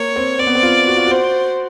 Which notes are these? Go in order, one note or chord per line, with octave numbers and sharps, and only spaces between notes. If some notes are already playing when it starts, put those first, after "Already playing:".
Already playing: A#3 C#5
C4
C4 D5
B3
C4
F4
F#4
F4
F#4
C5